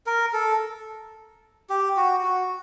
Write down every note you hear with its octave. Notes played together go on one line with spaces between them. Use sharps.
A#4
A4
G4
F#4
F#4